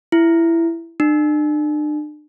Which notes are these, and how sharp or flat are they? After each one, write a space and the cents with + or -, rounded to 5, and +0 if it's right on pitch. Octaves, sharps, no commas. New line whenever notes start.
E4 +15
D4 +40